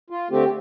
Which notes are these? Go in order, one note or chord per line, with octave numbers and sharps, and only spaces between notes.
F4
D3 A3 C4 G4